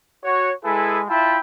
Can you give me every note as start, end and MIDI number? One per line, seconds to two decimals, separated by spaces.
0.24 0.52 66
0.24 0.52 73
0.65 1.03 56
0.65 1.03 64
0.65 1.03 68
0.65 1.03 69
0.65 1.03 71
0.65 1.03 80
1.09 1.39 64
1.09 1.39 65
1.09 1.39 76
1.09 1.39 79
1.09 1.39 81
1.09 1.39 83